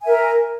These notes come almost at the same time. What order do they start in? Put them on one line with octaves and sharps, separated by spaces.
G#5 E5 A#4